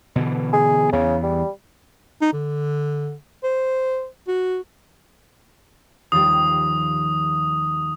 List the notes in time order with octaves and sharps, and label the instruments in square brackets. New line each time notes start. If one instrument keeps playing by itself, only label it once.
[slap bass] B2 D3 E3
[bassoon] G#4
[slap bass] E2 E3 B3 [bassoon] C#3
[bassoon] G3
[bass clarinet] D#4
D3
C5
F#4
[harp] D#2 F3 G3 [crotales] D#6